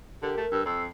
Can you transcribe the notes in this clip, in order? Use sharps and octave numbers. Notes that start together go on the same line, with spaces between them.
D3 G4 A#4
A3
G2 E6
F2 E6 C7